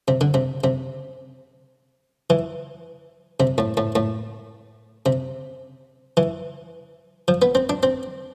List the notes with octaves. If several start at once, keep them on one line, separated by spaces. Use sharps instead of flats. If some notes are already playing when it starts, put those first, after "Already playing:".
C3
D3
C3
C3
E3
C3
A2
A2
A2
C3
E3
F3
B3
C4
D4
C4